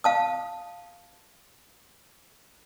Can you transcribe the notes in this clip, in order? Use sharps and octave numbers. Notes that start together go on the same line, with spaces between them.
F5 A5 D#6